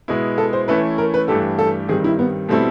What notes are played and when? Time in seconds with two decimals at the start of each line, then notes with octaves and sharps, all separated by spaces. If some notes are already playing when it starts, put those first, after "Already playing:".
0.08 B2 G#3 B3 E4
0.38 A4
0.53 C5
0.68 E3 A3 C#4 E4 B4
0.98 A#4
1.14 B4
1.28 G2 E3 A3 D4 G4 A4
1.59 A4
1.89 G2 D#3 G3 C4 G#4
2.04 E4
2.19 B3
2.49 B2 G3 A3 C4 E4 A4